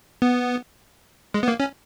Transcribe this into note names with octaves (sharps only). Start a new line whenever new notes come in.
B3
G#3
B3
A#3
C#4